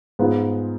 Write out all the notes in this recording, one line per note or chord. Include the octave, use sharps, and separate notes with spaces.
G#2 G#3 B3 F4